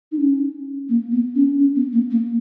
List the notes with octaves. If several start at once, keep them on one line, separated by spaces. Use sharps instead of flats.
D#4
C#4
A#3
B3
C#4
C#4
B3
A#3
A#3